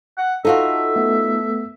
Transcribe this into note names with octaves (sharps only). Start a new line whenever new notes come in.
F#5
D#4 F4 F#4 A4 E5
A3 B3